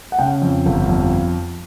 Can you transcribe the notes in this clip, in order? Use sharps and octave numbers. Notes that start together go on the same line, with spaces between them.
F#5
C#3 G5
F2
G1
F2